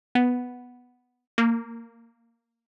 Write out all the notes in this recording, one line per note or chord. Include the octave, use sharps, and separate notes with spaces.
B3
A#3